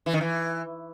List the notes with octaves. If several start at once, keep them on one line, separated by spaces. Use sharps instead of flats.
E3
D#3
E3